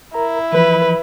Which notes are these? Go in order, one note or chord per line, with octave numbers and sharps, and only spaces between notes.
E4 A#4 A#5
E3 F3 B4